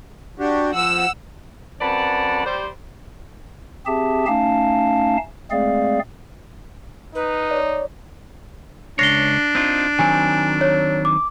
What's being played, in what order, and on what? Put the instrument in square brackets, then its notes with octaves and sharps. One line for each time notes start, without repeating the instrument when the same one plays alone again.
[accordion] D4 F#4 G4
[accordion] F3 [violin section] F#5 E6
[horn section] F#2 C4 B4 D5 F#5 A5
G3 C5
[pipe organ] C4 G4 G#4 E5 A5
A3 C#4 D#4 F5 A5
G#3 A3 C4 G#4 D5 F5
[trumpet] D#4 [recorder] B4
[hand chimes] C#5 D5
[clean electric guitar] C#2 C#5 [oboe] D4 [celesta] A#6 C7 G7
[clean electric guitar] C4 D#4 F4
[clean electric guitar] D#3 F#3 C4 [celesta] G#5
[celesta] C#5
D6